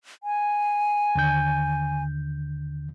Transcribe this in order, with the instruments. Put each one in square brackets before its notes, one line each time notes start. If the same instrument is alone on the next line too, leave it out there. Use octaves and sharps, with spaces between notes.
[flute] G#5
[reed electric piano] D#2 D3 G6